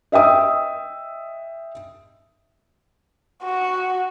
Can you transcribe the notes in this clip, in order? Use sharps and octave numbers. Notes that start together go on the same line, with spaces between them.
D#5 E5 G5 D#6 E6
F#4